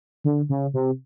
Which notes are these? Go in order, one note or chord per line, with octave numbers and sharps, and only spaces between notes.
D3
C#3
C3